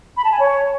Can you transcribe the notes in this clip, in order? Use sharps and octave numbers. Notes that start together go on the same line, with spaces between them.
B5
A5
G#5
C#5